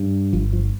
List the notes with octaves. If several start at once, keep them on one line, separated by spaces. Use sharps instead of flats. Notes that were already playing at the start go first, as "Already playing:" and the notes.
Already playing: G2
G1 F3
F3